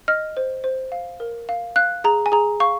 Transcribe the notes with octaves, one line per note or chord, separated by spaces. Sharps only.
D#5 F6
C5
C5
F5
A#4
F5
F5 F#6
G#4 A#5
G#5
G#4 A#5
F5 C#6